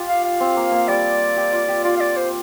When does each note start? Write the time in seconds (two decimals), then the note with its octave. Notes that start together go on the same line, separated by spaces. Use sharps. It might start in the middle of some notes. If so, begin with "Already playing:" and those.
Already playing: F4 G4
0.08 F5
0.25 F5
0.40 C4
0.57 A#3
0.72 A#3
0.88 G3 D5
1.37 G4
1.53 F4
1.68 G4
1.84 F4 D5
1.97 F5
2.00 D5
2.17 C5